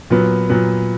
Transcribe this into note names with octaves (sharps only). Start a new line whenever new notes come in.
A#2 F#3 B3
A#2 F#3 B3